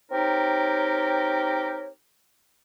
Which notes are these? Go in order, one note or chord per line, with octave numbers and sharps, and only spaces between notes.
C4 D#4 G4 A#4 C#5